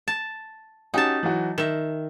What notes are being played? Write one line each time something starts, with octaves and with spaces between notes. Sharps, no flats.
A5
C#4 D#4 F#4 G4 A5
E3 F#3 F#4
D#3 E5 E7